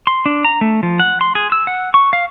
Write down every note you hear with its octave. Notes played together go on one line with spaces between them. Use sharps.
C6
D4
A#5
A3
F3
F#5
C6
G#4
E6
F#5
C#6
F5